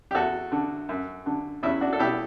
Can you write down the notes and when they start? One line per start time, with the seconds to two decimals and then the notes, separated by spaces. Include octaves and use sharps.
0.11 G4
0.14 E2 F#4 A4
0.52 D3
0.89 F#2
1.26 D3
1.63 E2 C#4 E4
1.81 D4 F#4
1.93 A4
1.99 B2 E4 G4